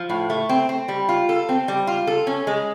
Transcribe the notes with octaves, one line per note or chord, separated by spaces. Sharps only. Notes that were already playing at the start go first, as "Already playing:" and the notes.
Already playing: F3
A2
A3
C4
C4
G3
F4
A4
C4
G3
F4
A4
C#4
G#3